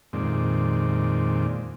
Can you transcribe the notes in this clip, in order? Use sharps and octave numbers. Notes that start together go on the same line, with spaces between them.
F2 A#2 D#3 G#3 C4 D5